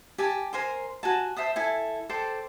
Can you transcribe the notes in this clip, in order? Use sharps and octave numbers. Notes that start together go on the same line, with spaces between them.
G4 G#5 A5
A#4 C5 G#5 C6
F#4 G#5 A5
C5 E5 A5 D#6
E4 A4 G#5
A4 C5 D5 G5